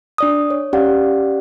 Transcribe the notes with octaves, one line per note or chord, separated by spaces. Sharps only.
D4 D5 D#6
C#5
C#4 G4 D5 F5 F#5